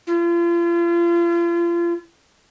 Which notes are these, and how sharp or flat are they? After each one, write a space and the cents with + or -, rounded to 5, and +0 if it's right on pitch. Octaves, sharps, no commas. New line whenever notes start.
F4 -40